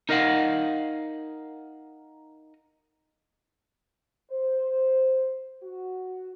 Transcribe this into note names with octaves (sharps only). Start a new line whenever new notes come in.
D#4 A#4 D#5 F5 F#5
C5
F#4